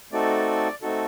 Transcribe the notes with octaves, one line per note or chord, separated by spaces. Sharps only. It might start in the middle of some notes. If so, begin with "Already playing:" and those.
A3 C4 D#4 F#4 A4 D5
A3 C4 D#4 F#4 A4